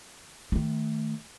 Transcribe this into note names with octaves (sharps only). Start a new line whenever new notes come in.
D#3 A3